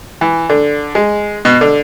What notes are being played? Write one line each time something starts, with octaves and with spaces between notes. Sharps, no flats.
E3
D3
G#3
B2
D3